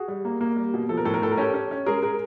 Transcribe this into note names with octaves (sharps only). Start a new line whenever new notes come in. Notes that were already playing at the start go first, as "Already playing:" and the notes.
Already playing: F#4 G#4
G3
A#3
A#3
G3
B2
F3 A4
A#4
A2 A4
A#4
A2 A4
A#4
C#4 G4 A4
C#4
C#4
G#3 G#4 A#4
G#4 A#4